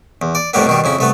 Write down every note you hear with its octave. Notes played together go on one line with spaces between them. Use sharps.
E2
D5
F2 A2 G3 A#3 B3
B2 D#3 G3
F2 C#3 E4
C2 A3 B3